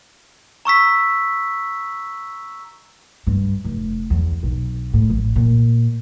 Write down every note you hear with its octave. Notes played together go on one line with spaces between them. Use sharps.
A#5 C#6 E6 B6
G2
F1
E2
B1
A2
A1
A#2